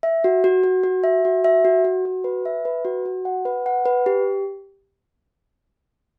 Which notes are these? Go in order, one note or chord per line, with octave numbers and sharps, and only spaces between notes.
E5
F#4
F#4
F#4
F#4
E5
F#4
E5
F#4
F#4
F#4
B4
E5
B4
F#4
F#4
F#5
B4
F#5
B4
G4